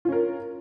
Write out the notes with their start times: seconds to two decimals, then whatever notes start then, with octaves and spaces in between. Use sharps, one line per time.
0.05 F4
0.09 C#4
0.12 A#4